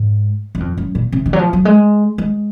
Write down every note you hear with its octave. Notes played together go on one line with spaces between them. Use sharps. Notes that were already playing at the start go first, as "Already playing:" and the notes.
Already playing: G#2
F#2
F2
F#2
A#2
C3
D#3
F#3
F3
F#3
G#3
G#3